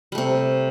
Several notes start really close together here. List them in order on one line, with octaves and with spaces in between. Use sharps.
G3 A3 C3